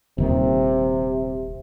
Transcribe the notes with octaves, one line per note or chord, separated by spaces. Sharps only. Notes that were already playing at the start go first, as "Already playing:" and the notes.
D#1 C3 D#3